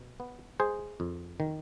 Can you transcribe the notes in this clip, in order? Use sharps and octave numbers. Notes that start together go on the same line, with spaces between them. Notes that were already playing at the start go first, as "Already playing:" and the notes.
Already playing: B2
B3
G#3 G#4 C5
F2
D#3